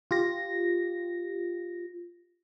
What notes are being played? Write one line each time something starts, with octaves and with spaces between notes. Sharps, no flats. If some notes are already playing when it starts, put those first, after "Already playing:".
F4 G4 A#6